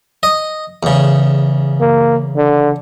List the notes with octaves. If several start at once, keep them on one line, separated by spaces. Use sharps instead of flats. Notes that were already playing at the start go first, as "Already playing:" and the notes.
D#5
E2 C#3
A#3
D3